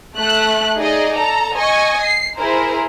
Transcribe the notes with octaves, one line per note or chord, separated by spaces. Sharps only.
A3 F#6
D#4 G#4 D5 D#5
A4 A#5
D#5 G#5 C#6
C7
E4 G#4 A#4 C5